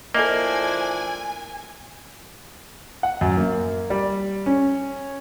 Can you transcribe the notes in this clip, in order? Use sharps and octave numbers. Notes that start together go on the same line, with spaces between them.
F3 A#3 D4 E4 A4 D#5 G#5
F#5
F#2
A#3
G3
C#4